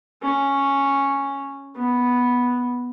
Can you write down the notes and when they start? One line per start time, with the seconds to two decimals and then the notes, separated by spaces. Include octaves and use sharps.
0.22 C#4
1.76 B3